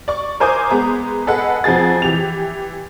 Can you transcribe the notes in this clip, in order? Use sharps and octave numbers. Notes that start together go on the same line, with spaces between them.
D5 C#6
A#4 C5 G#5 D6 D#6 G6
G#3 B3 A#5
G#4 A4 B4 D#5 F#5
F2 F3 F#4 G#4 A6
E3 G4 F7